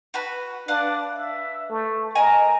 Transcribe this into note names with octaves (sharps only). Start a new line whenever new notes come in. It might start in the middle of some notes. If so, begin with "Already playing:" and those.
F#4 B4 B5
D4 B4 F5 F#5
E5
A3
A#4 D#5 G#5 A#5